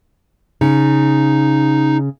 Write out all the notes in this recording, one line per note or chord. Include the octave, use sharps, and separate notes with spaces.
C#3 D#4